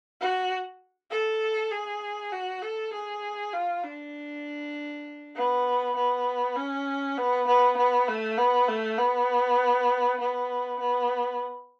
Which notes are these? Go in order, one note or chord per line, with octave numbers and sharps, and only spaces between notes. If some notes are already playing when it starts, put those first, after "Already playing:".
F#4
A4
G#4
F#4
A4
G#4
F4
D4
B3
B3
C#4
B3
B3
B3
A3
B3
A3
B3
B3
B3